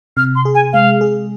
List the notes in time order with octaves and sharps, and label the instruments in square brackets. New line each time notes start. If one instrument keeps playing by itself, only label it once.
[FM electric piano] C3 [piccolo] F6
[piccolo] C6
[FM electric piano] G#4
[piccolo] G#5
[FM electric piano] G#3 [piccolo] F5
[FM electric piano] G#4